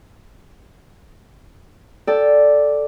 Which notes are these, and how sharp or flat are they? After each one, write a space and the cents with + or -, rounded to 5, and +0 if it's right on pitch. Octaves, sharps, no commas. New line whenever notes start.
A4 +0 D5 +0 G5 +0